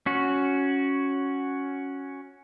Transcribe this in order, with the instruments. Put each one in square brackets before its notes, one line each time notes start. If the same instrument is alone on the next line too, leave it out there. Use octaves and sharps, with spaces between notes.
[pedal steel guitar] C#4 F#4